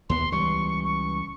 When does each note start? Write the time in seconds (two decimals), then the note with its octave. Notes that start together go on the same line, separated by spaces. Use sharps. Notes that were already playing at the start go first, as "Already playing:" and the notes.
0.10 D#2 B3 C6
0.32 C#2 E3 G3 C#6
0.84 C#6